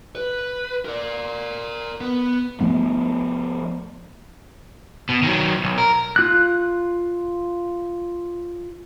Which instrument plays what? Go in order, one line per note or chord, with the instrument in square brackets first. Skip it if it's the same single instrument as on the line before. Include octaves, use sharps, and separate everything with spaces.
[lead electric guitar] B4
A#4 D5
B3
[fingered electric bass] F3 A3 B3
[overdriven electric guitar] B2
D#3 F#3
B1
A#4
[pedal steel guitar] F4 F#6